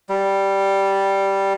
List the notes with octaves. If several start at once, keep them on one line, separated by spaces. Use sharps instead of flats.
G3